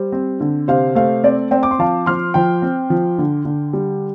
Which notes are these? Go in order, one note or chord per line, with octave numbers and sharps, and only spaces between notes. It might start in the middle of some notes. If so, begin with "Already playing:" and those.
Already playing: G3 C5
C4
D3
C3 C5 F5
A3 C5 F5
C4 D5
C4 D5 G5
D6
C6
F3 F5 A5
F3 C6 F6
F3 G5 C6
C4
F3
D3
D3
G3